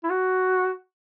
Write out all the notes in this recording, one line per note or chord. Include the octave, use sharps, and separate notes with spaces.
E4
F#4